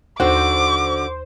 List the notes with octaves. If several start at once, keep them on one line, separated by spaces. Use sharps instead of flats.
D#2 D3 F#4 C5 D6